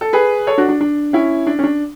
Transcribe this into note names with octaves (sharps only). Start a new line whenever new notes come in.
A4
G#4 B4
A4 C#5
D4 F#4
D4
D4
C#4 E4
D4
C#4
D4